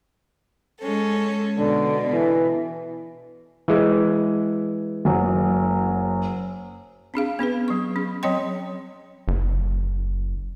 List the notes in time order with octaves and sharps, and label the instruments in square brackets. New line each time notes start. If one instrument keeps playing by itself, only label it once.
[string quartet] G#3 C#4 A4
[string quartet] B2 [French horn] D3
[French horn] E3
[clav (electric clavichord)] E3 G#3
[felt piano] F#1 F#3
[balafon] C4 D4 G#4 F5
B3 C#4 G#4 B4
F#3 C#6
C#4 G#4
F#3 C4 C#5 D#5 G5 C6
[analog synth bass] F#1